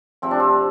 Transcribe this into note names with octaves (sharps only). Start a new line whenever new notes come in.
C3 F3 C4
D4
C4